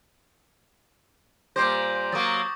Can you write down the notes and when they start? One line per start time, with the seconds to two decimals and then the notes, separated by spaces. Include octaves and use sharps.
1.56 A#2 G3 C5 D6 G6 A#6
2.12 F#3 A#3 C#6 D#6 A6